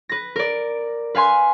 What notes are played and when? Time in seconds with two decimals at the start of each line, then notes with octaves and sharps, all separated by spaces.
0.09 B4 A#6
0.36 A#4 D5
1.15 B4 F5 G#5 C6